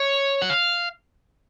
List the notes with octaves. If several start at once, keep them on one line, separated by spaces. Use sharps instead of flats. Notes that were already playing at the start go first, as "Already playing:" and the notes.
Already playing: C#5
F#5
F5